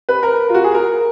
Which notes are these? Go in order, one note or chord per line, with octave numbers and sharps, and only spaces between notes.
B4
A#4
F4
F#4
G#4
A#4